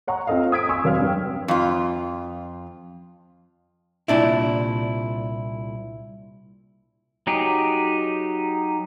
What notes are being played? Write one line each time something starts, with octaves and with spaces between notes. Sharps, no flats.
C#5 F#5 A#5 C#6
C4 F4 A4 D#5 F5
D#6 G#6 B6 D7
G#5 C6 C#6 E6
F1 F#3 C#5 F5 F6
G2 G5
F2 F4
C2 A#2 D4 E4
F#3 D#4 G4 G#4